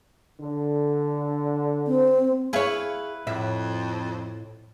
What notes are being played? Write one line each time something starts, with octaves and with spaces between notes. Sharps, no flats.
D3
C4
E4 G#4 B4 C#5 F5
F2 A2 E5